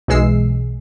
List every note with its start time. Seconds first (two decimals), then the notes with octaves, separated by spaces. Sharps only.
0.08 B1 E3 G#3 E6 C7